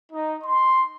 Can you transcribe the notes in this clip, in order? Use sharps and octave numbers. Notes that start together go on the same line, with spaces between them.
D#4
C6